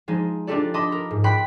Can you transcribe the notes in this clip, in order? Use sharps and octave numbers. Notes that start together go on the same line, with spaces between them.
F3 G#3 D#4
D4 D#4 F4 G4 A4 D5
D#5 A5 B5 C6 D6 D#6
A#4
G#2
G5 B5 C6 F#6 B6 D7